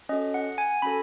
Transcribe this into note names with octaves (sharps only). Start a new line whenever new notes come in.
C#4 F#4 A4 D#5
F#5
G#5
C#4 F#4 A4 B5